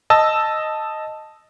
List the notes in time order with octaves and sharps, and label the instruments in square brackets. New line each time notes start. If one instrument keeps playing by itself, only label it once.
[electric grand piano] D#5 A5 E6